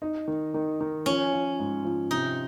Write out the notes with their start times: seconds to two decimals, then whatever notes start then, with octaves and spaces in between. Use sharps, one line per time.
0.02 D#4
0.28 D#3
0.54 D#3
0.81 D#3
1.06 F3 C#4
1.33 F3
1.59 G#2
1.85 F3
2.11 C3 D#4